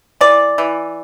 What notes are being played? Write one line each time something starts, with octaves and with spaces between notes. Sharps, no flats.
E3 D5
E3